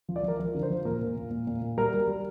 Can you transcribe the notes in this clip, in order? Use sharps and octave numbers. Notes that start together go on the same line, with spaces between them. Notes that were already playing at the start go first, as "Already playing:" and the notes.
F3
D5
F3
A#4
F3 A#4
D3
C5
F3
A#2 A#4
A#2
A#2
A#2
A#2
A#2
G3 A#4
G3
G3